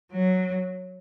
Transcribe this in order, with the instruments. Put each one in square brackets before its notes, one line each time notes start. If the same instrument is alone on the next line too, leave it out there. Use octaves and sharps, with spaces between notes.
[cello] F#3